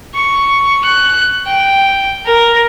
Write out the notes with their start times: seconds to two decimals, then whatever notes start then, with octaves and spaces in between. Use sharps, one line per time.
0.15 C#6
0.85 F#6
1.47 G5
2.26 A#4